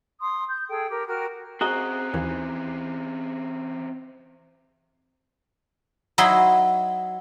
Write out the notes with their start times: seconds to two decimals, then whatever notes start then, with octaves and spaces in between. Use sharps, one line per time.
0.21 C6 D#6
0.48 G6
0.69 G#4 A4 G5
0.90 G4 A#4
1.07 F#4 A#4 G5 F6
1.61 C#3 C4 F#4 G#4 D#5 A#5 D#6 F#6
2.14 D#2 E3
6.18 F#3 D#4 E4 D#5 B5 C6